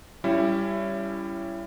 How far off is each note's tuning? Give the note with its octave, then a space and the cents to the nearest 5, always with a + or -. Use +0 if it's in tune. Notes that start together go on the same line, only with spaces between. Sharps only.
G3 +0 C#4 +15 E4 +25